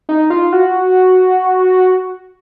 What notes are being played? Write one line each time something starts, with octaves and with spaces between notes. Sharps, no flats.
D#4
F4
F#4